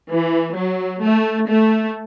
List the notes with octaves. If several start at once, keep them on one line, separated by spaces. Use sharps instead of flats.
E3
F#3
A3
A3